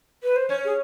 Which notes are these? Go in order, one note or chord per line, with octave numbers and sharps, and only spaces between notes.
B4
C5
C#4 C#5
G#4